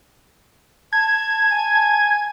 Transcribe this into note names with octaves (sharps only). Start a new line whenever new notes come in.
A5 G#6
G#5